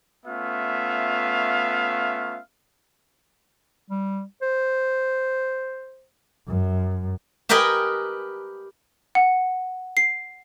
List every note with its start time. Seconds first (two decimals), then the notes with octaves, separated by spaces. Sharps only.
0.26 A3 B3 C#4 F4 E5 F5
3.90 G3
4.42 C5
6.48 F#2
7.49 G4 A#4 B4 D#5 G5 G#5
9.15 F#5
9.97 C7